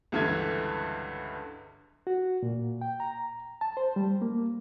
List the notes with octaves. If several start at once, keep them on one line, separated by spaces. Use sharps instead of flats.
C#2 G2 D3 E3 E5 G#6
F#4
A#2
G5
A#5
A5
C5
G3
A#3